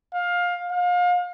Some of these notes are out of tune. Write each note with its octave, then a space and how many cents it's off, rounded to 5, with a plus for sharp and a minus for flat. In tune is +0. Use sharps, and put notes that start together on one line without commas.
F5 +20
F5 +35